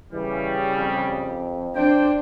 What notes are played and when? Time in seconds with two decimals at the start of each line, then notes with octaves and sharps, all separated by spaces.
0.13 C#3 E3 G3
0.75 F2
1.76 D4 C5 D5 G5